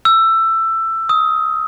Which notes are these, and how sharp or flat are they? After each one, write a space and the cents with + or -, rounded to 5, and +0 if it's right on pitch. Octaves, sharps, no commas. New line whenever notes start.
E6 +15
D#6 +25